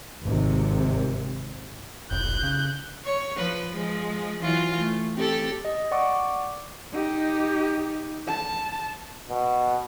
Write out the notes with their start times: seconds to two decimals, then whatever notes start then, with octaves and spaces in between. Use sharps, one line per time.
0.23 G#1 C3
2.11 F1 B1 F#6 G6
2.43 C#3
3.05 C#5
3.36 F3 B4
3.76 F3 G#3
4.42 E3 F#3 F4
4.78 A3
5.16 C4 G4 A4
5.65 D#5
5.91 D5 F#5 C#6 D6
6.93 D#4 G4
8.27 A5
9.30 B2